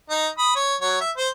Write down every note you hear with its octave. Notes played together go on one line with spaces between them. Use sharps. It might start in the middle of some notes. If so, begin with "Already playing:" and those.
D#4
B5 D#6
C#5
F#3 C#5
E5
C5